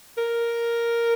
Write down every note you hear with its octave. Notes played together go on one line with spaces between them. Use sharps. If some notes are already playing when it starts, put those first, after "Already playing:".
A#4